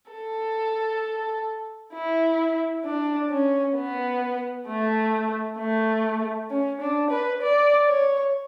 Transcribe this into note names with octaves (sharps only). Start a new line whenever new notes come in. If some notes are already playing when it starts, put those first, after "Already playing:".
A4
E4
D4
C#4
B3
A3
A3
C#4
D4
B4
D5
C#5